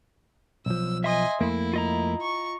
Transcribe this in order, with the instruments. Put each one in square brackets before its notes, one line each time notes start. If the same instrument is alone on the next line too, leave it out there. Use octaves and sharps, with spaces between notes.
[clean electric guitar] B1 F3 [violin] E6
[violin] D#5 G#5 [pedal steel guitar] E5 C6 D#6
[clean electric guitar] F2 A3 A#3 [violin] E4
[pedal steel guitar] F4 D#5 A#5
[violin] C#6